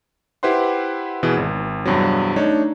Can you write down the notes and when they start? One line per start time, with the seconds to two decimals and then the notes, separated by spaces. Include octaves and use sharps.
0.43 E4 G4 B4 C5 F#5 C6
1.23 B2 E3 G#4
1.37 G#1
1.86 E2 G2 C3 F#3
2.36 A3 D4 D#4 C#5